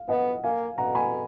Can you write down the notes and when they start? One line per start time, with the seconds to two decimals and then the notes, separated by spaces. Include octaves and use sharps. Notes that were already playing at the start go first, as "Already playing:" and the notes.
Already playing: F5
0.09 B3 D#5 F#5
0.43 A#3 F5 G#5
0.78 B2 F#5 A#5
0.95 G#5 B5